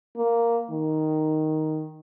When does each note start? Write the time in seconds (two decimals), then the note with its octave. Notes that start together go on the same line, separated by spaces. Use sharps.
0.16 A#3
0.70 D#3